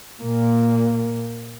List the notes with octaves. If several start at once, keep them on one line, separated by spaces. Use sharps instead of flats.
A#2 A#3